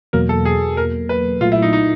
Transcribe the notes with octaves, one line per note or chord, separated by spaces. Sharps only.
E2 B2 F#3 A#3 A#4
A4
G#4
A#4
B4
A#2 F#3 A3 F4
E4
D#4
D#4